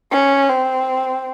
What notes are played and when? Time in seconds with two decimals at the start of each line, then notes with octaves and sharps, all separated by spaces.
0.11 C#4
0.50 C4